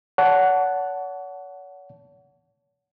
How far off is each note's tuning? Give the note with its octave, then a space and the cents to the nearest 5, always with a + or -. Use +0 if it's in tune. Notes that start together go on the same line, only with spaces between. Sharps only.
C#5 +40 F#5 +0 A5 +0